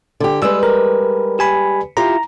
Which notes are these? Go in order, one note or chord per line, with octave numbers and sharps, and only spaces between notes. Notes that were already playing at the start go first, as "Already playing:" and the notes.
D3 G4
G3 G#3 B4 E6
A#4
G4 G#5 B5
E4 F4 G4 A#5